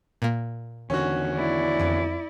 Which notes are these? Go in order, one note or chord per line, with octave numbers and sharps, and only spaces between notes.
A#2 A#3
E2 D3 D#3 C#4 F#4
E4 D5
F2